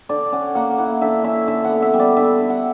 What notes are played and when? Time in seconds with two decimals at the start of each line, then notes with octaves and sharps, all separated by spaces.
0.09 D3 D5
0.32 C#4 F#5
0.55 A#3 F#5
0.78 E4 F#5
1.01 D3 E5
1.24 C#4 E5
1.48 D3 E5
1.64 F#5
1.70 B3
1.82 E5
1.94 G3
1.99 D5
2.16 D3 E5
2.39 D3
2.50 F#5